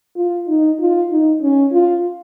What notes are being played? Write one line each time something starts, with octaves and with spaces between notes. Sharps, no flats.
F4
D#4
F4
D#4
C#4
F4